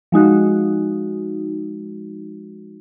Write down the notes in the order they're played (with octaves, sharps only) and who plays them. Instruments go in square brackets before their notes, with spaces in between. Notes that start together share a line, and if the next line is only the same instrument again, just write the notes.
[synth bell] F3 G#3 D#4 F#4